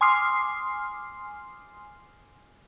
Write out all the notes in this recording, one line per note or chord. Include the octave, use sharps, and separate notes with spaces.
G#5 C6 D6 D#6 F6 C7